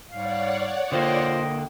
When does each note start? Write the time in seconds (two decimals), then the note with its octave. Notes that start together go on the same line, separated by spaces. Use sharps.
0.11 G#2 G3 C#5 D5 F5 F#5
0.92 D3 A#3 F4 C5 D#5 G5